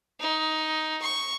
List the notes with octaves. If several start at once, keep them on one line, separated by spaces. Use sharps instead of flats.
D#4
C#6